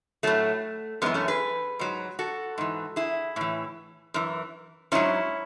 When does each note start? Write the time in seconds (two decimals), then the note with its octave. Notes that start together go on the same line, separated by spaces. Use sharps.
0.23 A2 F#3 A3
1.02 F#2 E3 G#3 B3
1.14 A3 C#4
1.28 G#4 B4
1.79 G#2 F#3
2.19 F#4 A4
2.58 G#2 E3
2.96 E4 G#4
3.36 A2 E3
4.14 F#2 E3
4.92 G#2 F#3 C#4 E4